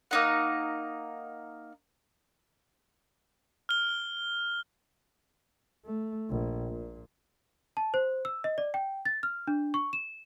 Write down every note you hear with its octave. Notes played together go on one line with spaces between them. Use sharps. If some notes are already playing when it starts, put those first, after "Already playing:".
A#3 D#4 F#5
F6 G7
A3
A#1
A#2
A5
C5
E6
D#5
D5
G5
A6
F6
D4
C#6
E7